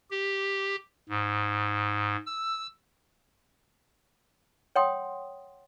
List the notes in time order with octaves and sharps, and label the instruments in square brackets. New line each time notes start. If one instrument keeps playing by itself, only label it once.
[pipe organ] G4
G#2
E6
[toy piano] C#5 F#5 G5 C6 D#6